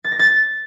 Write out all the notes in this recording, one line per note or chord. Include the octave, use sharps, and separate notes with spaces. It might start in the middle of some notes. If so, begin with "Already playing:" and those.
A6
A#6
A6